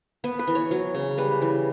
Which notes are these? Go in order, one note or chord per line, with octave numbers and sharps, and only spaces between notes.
B3 B4
B4
E3
C#5
F#3
C#3
G3 B4
E3